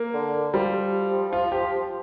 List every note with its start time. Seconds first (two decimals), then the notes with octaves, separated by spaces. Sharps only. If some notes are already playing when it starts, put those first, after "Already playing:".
Already playing: A#3
0.14 D3
0.54 F3 G3
1.33 F4
1.52 G4